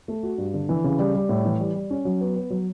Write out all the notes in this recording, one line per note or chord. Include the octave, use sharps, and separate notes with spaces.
A3
F#4
G2
D3
E3
C#3
G3
G3
A2
E3
G3
G3
C#4
F#3
B3
B3
F#3